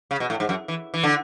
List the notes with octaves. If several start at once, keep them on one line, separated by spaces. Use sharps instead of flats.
C#3
B2
A2
G#2
F#2
E3
E3
D3